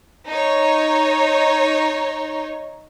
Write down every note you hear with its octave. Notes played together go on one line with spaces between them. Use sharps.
D#4 C#5